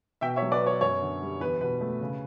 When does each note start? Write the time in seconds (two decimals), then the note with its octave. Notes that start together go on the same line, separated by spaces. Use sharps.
0.21 B2 E5 G5
0.36 C#5 E5
0.42 F#3
0.52 B4 D5
0.61 B3
0.66 C#5
0.81 F#2 C#5
1.02 D3
1.21 G3
1.40 E2 B4
1.61 B2 B4
1.81 A3
2.01 C#3